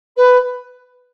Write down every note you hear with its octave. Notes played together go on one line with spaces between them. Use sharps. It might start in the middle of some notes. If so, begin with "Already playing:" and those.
B4